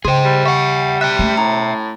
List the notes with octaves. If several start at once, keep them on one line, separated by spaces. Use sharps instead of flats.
C#3 G#4 C5 G5 C6
G3
E5 F#5 C#6
E5 G5 F#6
A3 C#4
A2 A#5